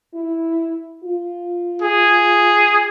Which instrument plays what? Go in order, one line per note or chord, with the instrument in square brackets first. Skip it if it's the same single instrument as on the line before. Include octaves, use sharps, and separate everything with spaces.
[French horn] E4
F4
[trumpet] G#4